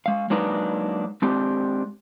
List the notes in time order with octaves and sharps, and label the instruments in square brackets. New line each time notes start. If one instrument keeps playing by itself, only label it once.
[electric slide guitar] G#3 F5
F#3 G#3 A#3 D4 D#4 B4
G#3 C4 D4 G4